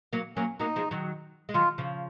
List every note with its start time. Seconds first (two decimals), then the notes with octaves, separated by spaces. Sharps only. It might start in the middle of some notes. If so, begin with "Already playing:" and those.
0.13 F#3 A#3
0.36 F#3 A#3 C#4
0.60 F#3 A#3 D#4
0.76 F3 G#3
0.91 D#3 F#3
1.49 G#3
1.54 D#3 F#3 F4
1.78 C#3 F3